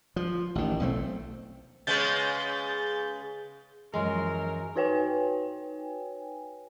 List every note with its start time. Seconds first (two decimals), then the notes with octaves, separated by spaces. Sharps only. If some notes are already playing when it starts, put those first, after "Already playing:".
0.16 F3
0.55 A1 D#3
0.80 B1 A3 C4
1.87 C#3 G#3 B3 G6 A6
3.94 F#2 E3 F3 G#3 A#4 C6 C7
4.76 D#4 F#4 B4 C#5 G5 G#5